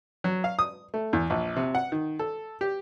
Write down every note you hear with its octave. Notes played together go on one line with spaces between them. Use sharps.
F#3
F5
D#6
A3
E2
A#1
C3
F#5
D#3
A4
G4